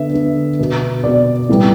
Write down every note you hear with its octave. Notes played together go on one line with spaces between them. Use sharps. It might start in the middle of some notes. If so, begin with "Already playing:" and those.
Already playing: D3 B3 E5
D3 B3
B2 B3
B2 B3 D5
A2 E3 G3 B3